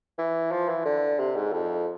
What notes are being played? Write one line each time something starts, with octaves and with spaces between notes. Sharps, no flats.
E3
F3
E3
D3
C3
G#2
F2